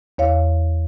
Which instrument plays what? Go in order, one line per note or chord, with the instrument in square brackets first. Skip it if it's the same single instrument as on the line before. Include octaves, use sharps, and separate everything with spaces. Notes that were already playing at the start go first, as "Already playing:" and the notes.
[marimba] E2 C#5 F5